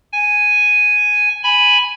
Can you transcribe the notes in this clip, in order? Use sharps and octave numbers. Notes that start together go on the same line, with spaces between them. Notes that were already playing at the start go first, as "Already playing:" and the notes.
G#5
G#5 B5